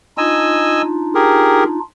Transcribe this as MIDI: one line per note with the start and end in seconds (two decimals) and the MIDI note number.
0.18 1.79 62
0.18 1.79 63
0.18 1.79 65
0.18 0.82 75
0.18 0.82 80
0.18 0.82 88
1.15 1.64 67
1.15 1.64 68
1.15 1.64 70